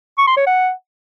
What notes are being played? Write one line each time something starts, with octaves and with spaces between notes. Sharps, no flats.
C#6
C6
C#5
F#5